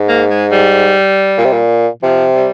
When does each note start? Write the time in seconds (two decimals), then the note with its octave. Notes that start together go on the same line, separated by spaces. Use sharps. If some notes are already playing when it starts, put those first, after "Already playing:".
Already playing: G#2
0.09 A#3
0.30 G#3
0.52 G3
1.38 A#2
1.45 C3
1.53 A#2
2.03 C3 F3
2.35 G3